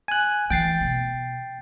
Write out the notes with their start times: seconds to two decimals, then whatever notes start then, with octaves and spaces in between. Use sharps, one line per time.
0.08 G#5 F#6
0.50 E3 G5 A6 C7
0.81 B2